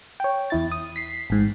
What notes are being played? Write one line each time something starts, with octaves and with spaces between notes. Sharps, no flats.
C#5 G5
E2 E4 A6
D#6
B6 C7
A1 G#2